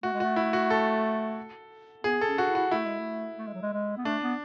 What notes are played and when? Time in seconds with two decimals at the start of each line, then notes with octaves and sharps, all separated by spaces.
0.03 A3 F#4
0.13 G#3
0.20 A3 F#4
0.36 E4
0.53 F#4
0.70 A4
2.04 B3 G#4
2.21 A4
2.27 C#4
2.38 D4 F#4
2.49 E4
2.55 F#4
2.71 A3 E4
2.85 G#3
2.99 A3
3.38 A3
3.47 G#3
3.54 F#3
3.63 G#3
3.73 G#3
3.97 B3
4.05 A3 D4
4.22 B3